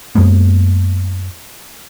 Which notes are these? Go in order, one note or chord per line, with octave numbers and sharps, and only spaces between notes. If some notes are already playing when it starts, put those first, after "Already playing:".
F#2 G#3 A#3 B3